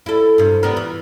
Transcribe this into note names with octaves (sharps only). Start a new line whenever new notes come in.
E4 A4
G2 C3
G3 B3 A#4
E3